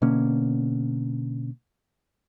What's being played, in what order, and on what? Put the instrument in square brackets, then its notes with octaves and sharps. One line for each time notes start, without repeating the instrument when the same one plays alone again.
[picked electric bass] B2 D3 A#3 C#4